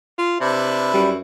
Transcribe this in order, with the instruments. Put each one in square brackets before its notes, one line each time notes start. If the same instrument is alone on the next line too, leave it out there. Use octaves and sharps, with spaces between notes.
[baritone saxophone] F4
[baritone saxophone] C3 [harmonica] D4 E4 B4
[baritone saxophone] F#2 [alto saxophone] G3